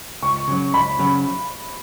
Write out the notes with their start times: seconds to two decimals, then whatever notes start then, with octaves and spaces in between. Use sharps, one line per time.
0.22 C#2 C#6
0.48 C#3 F#3
0.73 C#2 B5
0.99 C#3 F#3